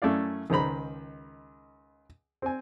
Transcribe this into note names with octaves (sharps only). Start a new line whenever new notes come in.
F#2 A3 C#4 E4 D5 F5
C#2 D#3 C5 A#5 B5
C4 G#5